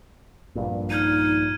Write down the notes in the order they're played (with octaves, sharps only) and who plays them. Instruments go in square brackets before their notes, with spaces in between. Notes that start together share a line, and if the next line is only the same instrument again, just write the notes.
[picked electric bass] A#1 G2 A#2
[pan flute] D#4 [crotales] F6 G#6 D#7